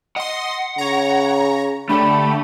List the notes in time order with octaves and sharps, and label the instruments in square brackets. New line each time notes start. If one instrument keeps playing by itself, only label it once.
[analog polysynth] D#5 C6 [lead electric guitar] F#5
[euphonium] C#3 [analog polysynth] C#5 A#5
[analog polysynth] D3 G4 A4 [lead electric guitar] A3 [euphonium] D4 [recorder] B5